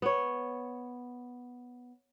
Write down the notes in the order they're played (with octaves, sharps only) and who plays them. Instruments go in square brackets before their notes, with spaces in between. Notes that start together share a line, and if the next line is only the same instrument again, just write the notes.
[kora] B3 C#5